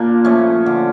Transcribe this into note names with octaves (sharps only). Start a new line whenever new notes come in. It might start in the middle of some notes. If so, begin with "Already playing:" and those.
Already playing: A#2 A#3 D4 F4
F3 A3 C#4
D3